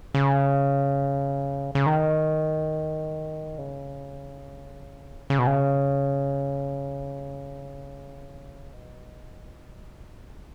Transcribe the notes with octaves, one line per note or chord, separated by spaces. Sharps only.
C#3
C#3
D#3
C#3
C#3
B2
C#3
B2